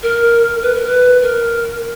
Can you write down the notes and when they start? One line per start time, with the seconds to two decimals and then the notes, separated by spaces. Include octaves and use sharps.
0.03 A#4
0.62 B4
0.74 A#4
0.86 B4
1.22 A#4